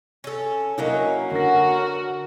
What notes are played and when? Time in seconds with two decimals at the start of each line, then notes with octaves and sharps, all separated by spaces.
0.24 C#4 A4
0.78 F#3 A#3 C#4 E4 A#4 D#5
1.31 D3 F#4 A#4 A#6